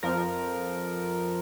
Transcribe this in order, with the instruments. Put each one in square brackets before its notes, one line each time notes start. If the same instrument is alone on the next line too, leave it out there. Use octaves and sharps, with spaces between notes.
[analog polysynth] F2 F3 A#4